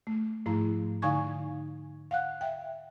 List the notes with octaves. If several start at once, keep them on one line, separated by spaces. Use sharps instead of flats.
A3
G#2 F3 A3 E4 A#5
D3 D#4 F5 G#5 C#6 G#6
F5 F#5 F#6
E5 G5